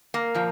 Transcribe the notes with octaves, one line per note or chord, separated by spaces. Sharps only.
A#3
A#2 F3